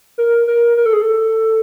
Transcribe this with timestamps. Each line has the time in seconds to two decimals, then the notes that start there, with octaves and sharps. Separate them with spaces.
0.18 A#4
0.47 A#4
0.77 A#4
0.86 A4
0.93 G#4
1.02 A4